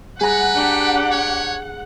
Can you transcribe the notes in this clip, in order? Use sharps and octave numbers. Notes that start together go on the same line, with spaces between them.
G3 G#4 B4 F#5 A#5
D4 G4
C#5